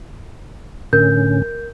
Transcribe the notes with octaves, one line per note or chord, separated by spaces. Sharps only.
A2 D3 C#4 A#4 G6